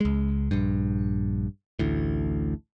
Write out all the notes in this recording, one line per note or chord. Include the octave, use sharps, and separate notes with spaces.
C#2 G#3
A#1 G2
A1 D2 A2